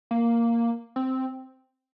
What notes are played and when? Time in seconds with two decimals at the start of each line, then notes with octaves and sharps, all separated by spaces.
0.11 A#3
0.96 C4